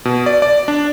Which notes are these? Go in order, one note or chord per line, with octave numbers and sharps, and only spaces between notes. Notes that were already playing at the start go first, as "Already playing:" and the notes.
B2
D5
D5
D4